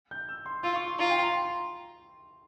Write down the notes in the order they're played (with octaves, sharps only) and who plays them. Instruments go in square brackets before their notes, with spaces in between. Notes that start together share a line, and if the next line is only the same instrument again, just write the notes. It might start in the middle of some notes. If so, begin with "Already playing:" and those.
[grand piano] G6
E6
C6
[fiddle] F4 [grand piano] E6
[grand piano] C#6
C6
[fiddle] F4 [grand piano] A#5
[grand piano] G5
A#5
C6